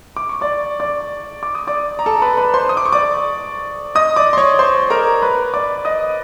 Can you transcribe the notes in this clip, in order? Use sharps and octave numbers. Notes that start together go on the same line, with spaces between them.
D6
C#6
D5 D6
D5 D6
D6
D#6
D5 D6
A#5
A4 A5
B4 B5
B4 B5
C5 C6
D#6
D6
C#6
D5 D6
D#5 D#6
D5 D6
C6
C#5 C#6
C5 C6
A#4 A#5
B4 B5
D5 D6
D#5 D#6